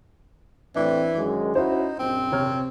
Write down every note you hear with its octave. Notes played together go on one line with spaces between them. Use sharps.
A2 E3 A3 C4 D4
F#2 D#3 G#3
C#4 D#4 E4 F#4 C5
A#1 F#2 C4
C3 C#5 F6